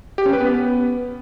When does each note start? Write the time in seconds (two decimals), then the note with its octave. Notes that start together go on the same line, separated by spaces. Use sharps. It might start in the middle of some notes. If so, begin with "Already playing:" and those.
0.18 G4
0.26 C#4
0.33 B4
0.41 B3